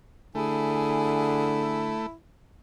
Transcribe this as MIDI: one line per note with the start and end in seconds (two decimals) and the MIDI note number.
0.35 1.96 50
0.35 2.06 57
0.35 2.15 64
0.35 1.79 68
0.35 1.79 80